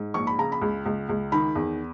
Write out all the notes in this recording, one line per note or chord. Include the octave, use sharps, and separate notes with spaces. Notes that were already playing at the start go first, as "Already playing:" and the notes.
Already playing: G#2
A#1 C#6
B5
C#3 A#5
B5
C#2
C#2
C#2
D#3 B5
E2